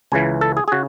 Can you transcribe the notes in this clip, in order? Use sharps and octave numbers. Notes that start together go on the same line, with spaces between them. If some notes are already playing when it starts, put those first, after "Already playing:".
C#2 C#3 E3 G#5
A4
G#4
G#4
C#3 F#4